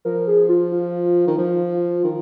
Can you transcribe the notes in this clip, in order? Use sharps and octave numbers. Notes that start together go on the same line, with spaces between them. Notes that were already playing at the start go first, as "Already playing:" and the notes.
F3 A#4
G#4
F4
F4
D#3
F3
D#3